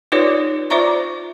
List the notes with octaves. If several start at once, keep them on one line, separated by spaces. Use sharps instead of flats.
D#4 F4 G4 B4 C#5 D5
F4 C5 D5 E5 A#5 C#6